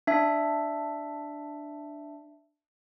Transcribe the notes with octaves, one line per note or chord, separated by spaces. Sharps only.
D4 E5